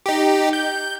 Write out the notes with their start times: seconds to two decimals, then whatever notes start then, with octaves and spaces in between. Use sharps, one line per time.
0.06 D#4 G4
0.53 G6